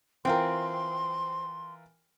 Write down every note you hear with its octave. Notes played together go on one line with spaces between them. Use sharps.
E3 C4 F4 A#4 C6